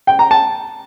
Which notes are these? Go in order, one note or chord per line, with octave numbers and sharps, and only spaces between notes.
G5
A#5
A5